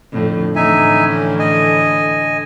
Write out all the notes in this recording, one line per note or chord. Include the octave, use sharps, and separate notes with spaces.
F2 A2 D3
A2 D3 E3 D#4 E5 G#5
C#4
D#5 G#5